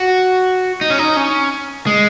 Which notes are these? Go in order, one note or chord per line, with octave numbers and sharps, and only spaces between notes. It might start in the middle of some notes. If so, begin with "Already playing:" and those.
Already playing: F#4
D#4
C#4
D#4
C#4
G#3